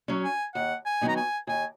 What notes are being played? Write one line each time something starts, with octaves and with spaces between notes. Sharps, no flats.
F#3 C#4
G#5
D#2 F#5
G#5
D#3 F#3 B3 D#4
A#5
G#5
D#2 G#5